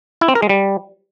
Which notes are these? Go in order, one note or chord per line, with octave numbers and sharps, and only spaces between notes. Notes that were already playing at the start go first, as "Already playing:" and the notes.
E4
C4
A#4
G#3
G3